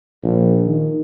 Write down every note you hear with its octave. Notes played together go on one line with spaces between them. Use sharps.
A#1
D#3